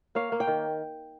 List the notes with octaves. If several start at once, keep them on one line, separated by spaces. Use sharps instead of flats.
A#3 C#5 F5
A#3
G5
D#3